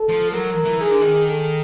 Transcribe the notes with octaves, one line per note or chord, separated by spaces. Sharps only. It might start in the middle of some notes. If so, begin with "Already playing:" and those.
Already playing: A4
F3
F#3 A#4
E3
D#3 G#4
D3
D#3
A4